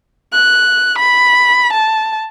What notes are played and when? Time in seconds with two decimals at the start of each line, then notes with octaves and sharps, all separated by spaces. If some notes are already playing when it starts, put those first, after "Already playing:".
0.33 F#6
0.99 B5
1.73 A5